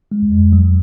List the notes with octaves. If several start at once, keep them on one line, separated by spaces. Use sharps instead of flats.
G#3
F2
F#3